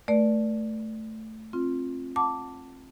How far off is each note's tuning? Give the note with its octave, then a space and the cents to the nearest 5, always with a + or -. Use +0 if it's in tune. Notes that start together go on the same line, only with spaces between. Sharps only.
A3 +0 A#4 +45 D5 +0
C4 +25 F4 +0
F#5 +0 A5 +10 D6 -5